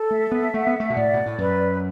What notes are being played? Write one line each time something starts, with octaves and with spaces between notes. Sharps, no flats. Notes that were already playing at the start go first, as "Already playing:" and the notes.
Already playing: A4
A3 E5
B3
A3 F#5
B3
A3
B2
A2 D5
B2
A2
F#2 B4